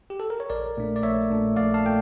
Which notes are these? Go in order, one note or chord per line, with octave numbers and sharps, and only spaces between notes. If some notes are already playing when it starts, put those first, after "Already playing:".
G4
A4
A#4
C#5
A#1 A#4 D5
A#2 A3 D4
D5
A#1 C#5 E5
A#2 A3 D4
A#1 D5 F5
F5 A5
A#2 A3 G5